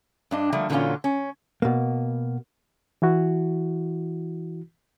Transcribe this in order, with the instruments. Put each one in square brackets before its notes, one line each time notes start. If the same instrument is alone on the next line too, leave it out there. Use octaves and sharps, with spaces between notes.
[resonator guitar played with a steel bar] G2 D4 D#5
D3 F3 G3 A3 A#3
A#2 D3 E3 F#3 C#4 F4
C#4
[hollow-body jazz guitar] B2 A#3
[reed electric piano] E3 E4 F#4